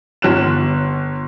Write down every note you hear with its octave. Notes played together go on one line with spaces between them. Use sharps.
G1 C#5 F#6 E7